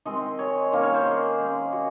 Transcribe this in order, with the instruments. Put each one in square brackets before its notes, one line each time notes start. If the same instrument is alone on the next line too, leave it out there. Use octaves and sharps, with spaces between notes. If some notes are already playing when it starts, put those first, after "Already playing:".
[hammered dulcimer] D#3 G#3 C4 D#5
C#5
D#3 A#3 C#4 C#5
C#5
C5
G#4
D#3 G#3 C#4
F#4